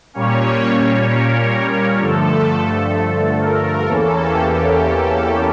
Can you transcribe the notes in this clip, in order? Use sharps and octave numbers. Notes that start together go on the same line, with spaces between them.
A#2 G3 A#3 C#4 C#5
A#4
G2 D3 F3 A3 A4
A#4
E2 E3 A#3 C#4 A4
G4
A4